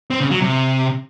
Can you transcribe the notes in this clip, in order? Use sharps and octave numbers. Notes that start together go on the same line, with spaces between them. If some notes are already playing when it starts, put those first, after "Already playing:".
C4
C#3
F#3
C3